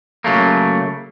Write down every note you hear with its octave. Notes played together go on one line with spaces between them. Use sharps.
C#3 F#3 A3 A#3